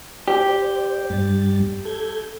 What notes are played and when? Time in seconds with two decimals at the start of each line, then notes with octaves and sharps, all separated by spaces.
0.28 G4 C5 D5
1.10 G2 G3 A6
1.85 A4 G6 G#6